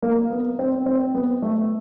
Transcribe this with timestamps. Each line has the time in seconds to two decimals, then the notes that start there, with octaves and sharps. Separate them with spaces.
0.02 A#3
0.30 B3
0.59 C4
0.86 C4
1.14 B3
1.42 A3